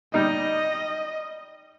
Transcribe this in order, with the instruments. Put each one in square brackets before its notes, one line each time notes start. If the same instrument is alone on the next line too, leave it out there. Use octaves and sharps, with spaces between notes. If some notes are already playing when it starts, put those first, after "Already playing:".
[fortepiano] G3 D#4 [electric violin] D#5